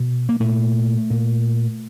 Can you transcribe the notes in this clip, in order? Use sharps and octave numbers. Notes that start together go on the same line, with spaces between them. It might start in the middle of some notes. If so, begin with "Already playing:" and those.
Already playing: B2
A#3
A#2 A3
A#2